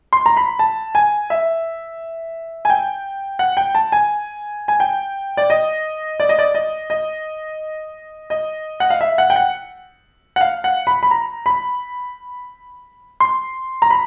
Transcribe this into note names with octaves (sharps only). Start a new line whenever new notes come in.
C6
A#5
B5
A5
G#5
E5
G#5
G5
F#5
G5
A5
G#5
G#5
G5
D5
D#5
D5
D#5
D5
D#5
D#5
D#5
F#5
F5
E5
F#5
G5
F#5
F#5
F5
F#5
B5
B5
A#5
B5
C6
A#5
B5